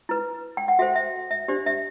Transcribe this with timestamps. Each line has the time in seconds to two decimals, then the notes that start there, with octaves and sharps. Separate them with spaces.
0.09 E4 B4
0.57 G5
0.68 F#5
0.79 F#4 A4 C5 E5
0.96 E5
1.31 E5
1.48 D4 G4 C5 D5
1.66 E5